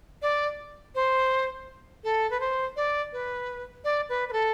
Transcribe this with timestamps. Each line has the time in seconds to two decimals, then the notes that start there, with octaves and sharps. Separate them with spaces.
0.22 D5
0.95 C5
2.04 A4
2.31 B4
2.40 C5
2.76 D5
3.13 B4
3.84 D5
4.09 B4
4.29 B4
4.33 A4